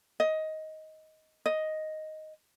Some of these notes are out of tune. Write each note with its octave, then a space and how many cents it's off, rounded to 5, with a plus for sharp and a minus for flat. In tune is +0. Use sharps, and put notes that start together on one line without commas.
D#5 +15
D#5 +5